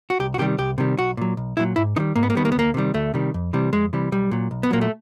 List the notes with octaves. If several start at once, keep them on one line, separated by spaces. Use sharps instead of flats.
F#4
C2 G4
F#4
C3 D#3 G3 G4
C2 G4
C3 D#3 G3
B1 F#4
A#2 F#3
B1
A#2 F#3 E4
G#2 E4
D#3 G3 D#4
G#2 A#3
B3
A#3
D#3 G3 B3
A#3
B3
D2 A#3
C3 D#3 G3
D2 A3
C3 D#3 G3
F2
C3 E3 G3
F2 G#3
C3 E3 G3
B1 G3
A#2 F#3
B1
B3
A#2 F#3 A#3
A3